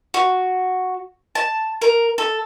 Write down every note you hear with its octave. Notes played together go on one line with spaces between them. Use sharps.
F#4
A5
A#4
A4